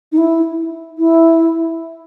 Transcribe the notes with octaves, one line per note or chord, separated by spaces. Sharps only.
D#4
E4
E4